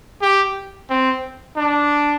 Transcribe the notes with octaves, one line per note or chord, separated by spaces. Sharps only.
G4
C4
D4